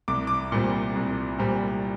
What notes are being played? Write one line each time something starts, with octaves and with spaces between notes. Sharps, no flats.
C2 D6
D6
A#2 G3 C4
C2
A#2 G3 C4